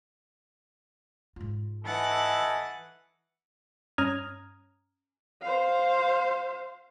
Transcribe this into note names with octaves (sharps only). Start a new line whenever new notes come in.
G#2 F4
E3 A4 D#5 F#5 G#5 A6
G2 C#4 A#5 D#6 F6 G#6
C5 F5